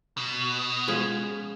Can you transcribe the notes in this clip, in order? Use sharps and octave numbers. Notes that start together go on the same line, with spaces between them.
B2
F3 G#3 C#4